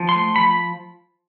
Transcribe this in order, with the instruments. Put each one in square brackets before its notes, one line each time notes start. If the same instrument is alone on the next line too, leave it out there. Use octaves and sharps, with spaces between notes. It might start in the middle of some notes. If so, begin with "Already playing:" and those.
Already playing: [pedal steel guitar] F3
C6
A3
F3 B5